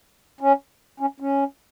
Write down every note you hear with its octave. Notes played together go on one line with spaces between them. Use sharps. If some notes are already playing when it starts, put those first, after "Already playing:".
C#4
C#4
C#4